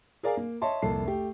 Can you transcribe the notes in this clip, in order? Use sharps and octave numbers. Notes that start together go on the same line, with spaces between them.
G#4 A#4 D5 F5 G#5
A#3
C#5 D#5 E5 A5 C6
C2 F2 A#3 A4 A5 C7
A3 G4